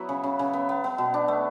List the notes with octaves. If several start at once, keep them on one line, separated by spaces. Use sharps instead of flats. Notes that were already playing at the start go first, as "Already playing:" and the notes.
Already playing: F#3 B3 E4
C#3
C#3
C#3
B3
B3
B3
B2
D4
A3